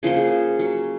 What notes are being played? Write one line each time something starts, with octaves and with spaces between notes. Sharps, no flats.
C#3 F3 A#3 C6
G#4
F#3